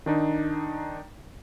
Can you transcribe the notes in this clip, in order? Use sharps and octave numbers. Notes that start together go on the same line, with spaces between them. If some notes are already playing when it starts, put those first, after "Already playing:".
D#3 D4 D#4